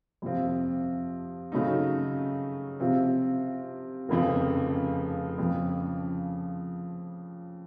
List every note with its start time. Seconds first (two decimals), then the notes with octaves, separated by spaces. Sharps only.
0.22 F2 C3 F3 C4 F4
1.52 C#3 F#3 A3 D#4
2.80 C3 F3 C4 F4
4.09 F1 F2 C#3 F3
5.38 F2 C#3 F3